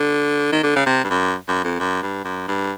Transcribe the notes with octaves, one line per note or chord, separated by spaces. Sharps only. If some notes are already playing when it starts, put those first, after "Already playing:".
Already playing: D3
D#3
D3
C#3
C3
G2
F#2
F#2
F2
F#2
G2
F#2
G2